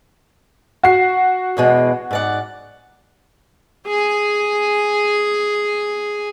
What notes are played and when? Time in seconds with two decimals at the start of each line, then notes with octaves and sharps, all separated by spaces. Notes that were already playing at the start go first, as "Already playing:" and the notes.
0.83 F#4 C7
1.57 E2 B2 G#3
2.11 G#2 D5 F#5
3.87 G#4 G#5